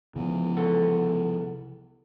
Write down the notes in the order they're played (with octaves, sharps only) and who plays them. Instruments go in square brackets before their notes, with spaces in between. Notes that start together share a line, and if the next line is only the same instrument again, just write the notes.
[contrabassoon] E2 [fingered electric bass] C#3 F3
[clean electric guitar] C2 A4 F#5